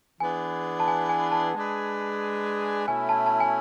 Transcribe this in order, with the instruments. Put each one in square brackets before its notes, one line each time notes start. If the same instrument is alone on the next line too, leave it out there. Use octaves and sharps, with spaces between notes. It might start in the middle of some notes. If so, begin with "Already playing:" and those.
[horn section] E3 B3 D4 G#4 B4 [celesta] G#5
[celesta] A5
G#5
G#5
A5
[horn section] G#3 D4 G#4 B4
[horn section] B2 A3 C#4 E4 [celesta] G#5
[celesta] A5
A5
G#5